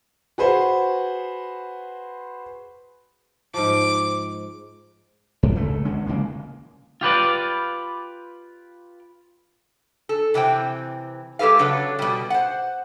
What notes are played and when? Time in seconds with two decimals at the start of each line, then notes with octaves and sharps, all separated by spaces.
0.38 F#4 G#4 B4 C5 F#5
3.54 G#2 F3 D6
5.43 G2
5.56 C#2 A3
5.85 D3 G#3 C#4
6.06 C#3 G#3 A#3
7.01 F4 G4 B4 D5
10.09 A4
10.34 C3 E3 C4 G5
11.39 G#3 G4 A4 B4 F5
11.59 C#3 F#3 D4 A4 C#5
11.99 B2 G3
12.30 C5 F#5